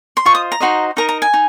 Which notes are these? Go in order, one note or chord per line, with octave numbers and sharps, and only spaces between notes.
C6
F4 C5 D#5 C#6
D#6
A#5
D#4 F#4 C5 D#5
D#4 A#4 D#5 A#5
A#5
G#5
D#4